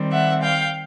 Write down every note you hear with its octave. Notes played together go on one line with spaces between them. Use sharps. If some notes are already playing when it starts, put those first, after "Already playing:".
Already playing: D#3 G3 C4
E5 F#5
F5 G5